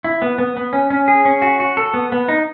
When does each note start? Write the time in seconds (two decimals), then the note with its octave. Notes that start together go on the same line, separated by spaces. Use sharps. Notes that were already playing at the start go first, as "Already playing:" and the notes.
0.04 E4
0.22 B3
0.38 B3
0.57 B3
0.73 C#4
0.90 C#4
1.08 G#4
1.25 C#4
1.42 F#4
1.60 F#4
1.77 A4
1.94 B3
2.12 B3
2.28 D#4